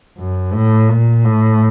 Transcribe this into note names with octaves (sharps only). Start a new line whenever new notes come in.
F#2
A2
A#2
A2